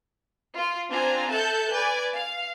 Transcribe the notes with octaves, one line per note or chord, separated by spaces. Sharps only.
F4
C4 D4 F4 G#5 A#5
A4 E5 A5 F#6 G6
B4 D5 G#5
F5